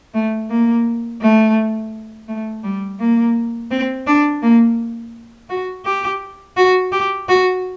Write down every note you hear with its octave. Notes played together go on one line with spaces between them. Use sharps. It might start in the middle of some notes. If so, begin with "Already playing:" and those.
A3
A#3
A3
A3
G3
A#3
C4
D4
A#3
F#4
G4
F#4
G4
F#4